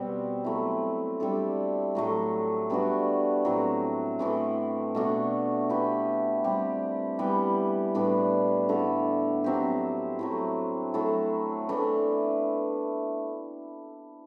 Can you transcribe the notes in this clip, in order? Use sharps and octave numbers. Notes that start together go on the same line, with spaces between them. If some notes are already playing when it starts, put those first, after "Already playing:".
Already playing: B2 G3 C4
F#3 A3 E4
G3 D4 A4
A2 F#3 A3
G3 B3 D4 F#4
A2 F#3 A3 C4
A2 E3 A3
B2 A3 D4 F#4
E3 B3 E4 G4
G3 C4 G4
E3 G3 B3
A2 G3 B3 D4
D3 A3 E4 A4
F#3 C4 G4
F#3 A3 E4
F#3 A3 E4 A4
E3 A3 D4